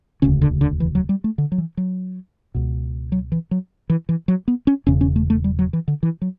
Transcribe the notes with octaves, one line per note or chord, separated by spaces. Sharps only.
E1 D2 C#3 C#4
D3
D3
E3
F#3
G3
A3
D3
F#3
E3
F#3
C#2 B2
F#3
E3
F#3
E3
E3
F#3
B3
C#4
E1 E2 C#3 C#4
C#4
A3
A3
G3
F#3
E3
D3
E3
F#3